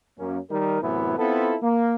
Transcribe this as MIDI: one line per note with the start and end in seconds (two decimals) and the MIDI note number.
0.19 0.38 42
0.19 0.38 58
0.19 0.38 61
0.50 0.81 51
0.50 0.81 55
0.50 0.81 63
0.50 0.81 70
0.82 1.15 42
0.82 1.15 45
0.82 1.15 48
0.82 1.15 52
0.82 1.15 59
0.82 1.15 64
1.18 1.56 59
1.18 1.56 60
1.18 1.56 64
1.18 1.56 65
1.18 1.56 69
1.62 1.95 58